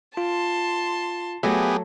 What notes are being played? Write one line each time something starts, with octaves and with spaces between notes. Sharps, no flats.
F4 A5 C6
F#3 A3 B3 G4 G#4 E5